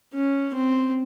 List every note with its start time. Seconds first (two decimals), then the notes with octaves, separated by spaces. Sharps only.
0.14 C#4
0.54 C4